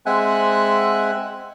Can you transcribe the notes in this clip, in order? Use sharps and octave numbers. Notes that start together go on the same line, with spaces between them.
G#3 C4 E5 F#5 G#5 F#6